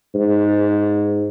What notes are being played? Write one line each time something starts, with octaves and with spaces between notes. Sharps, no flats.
G#2